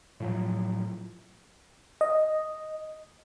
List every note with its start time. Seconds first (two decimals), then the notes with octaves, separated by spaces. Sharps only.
0.20 A2 F3 F#3
2.01 D#5